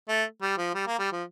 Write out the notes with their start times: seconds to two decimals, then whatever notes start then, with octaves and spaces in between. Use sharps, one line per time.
0.09 A3
0.42 G3
0.58 F3
0.74 G3
0.87 A#3
0.99 G3
1.12 F3